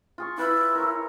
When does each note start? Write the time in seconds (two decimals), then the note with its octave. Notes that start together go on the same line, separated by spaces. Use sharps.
0.18 F4 G#4 C#6
0.38 E4 F4 B4 B5
0.75 A#4 C#5